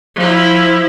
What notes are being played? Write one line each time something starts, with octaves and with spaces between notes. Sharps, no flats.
F3 E4